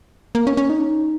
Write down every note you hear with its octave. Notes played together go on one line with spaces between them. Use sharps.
A#3
C#4
C#4
D#4